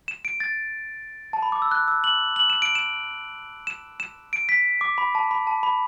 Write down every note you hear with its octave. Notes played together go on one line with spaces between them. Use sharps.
E7
D7
A6
A5
B5
D6
E6
F#6
E6
F#7
F#7
E7
D7
E7
E7
E7
D7
B6
D6
B5
A5
B5
A5
B5